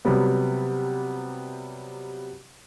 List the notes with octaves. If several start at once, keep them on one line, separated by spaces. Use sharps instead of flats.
C3 F#3 G3 B3